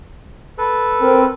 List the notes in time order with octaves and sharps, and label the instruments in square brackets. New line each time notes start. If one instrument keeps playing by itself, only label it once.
[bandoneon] A4 B4
[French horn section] C4 [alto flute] A#4